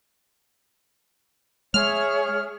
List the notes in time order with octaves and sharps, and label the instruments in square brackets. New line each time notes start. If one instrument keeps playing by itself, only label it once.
[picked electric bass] G#3 [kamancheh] G#4 E5 [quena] C#5 [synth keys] F6